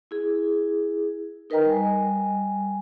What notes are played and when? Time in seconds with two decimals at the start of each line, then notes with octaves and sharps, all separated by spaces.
0.11 E4 G#4
1.50 D#4 A#4 B4 D#5 G5 A#5
1.65 G3 G#5